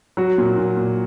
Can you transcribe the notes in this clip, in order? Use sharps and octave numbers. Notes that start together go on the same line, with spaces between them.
F#3 F#4
A#2
A#2
A#2